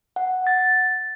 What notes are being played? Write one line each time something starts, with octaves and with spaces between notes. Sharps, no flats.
F#5
A6